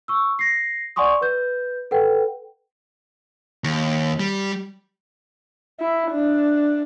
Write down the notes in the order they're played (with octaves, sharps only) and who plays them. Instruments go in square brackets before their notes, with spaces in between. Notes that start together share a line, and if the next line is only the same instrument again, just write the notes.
[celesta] C#6 E6
A#6 C7
D5 F#5 G#5 C6 C#6 D#6
B4 G6
A4 B4 F#5 G5
[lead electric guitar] D#2
G3
[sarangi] E4
D4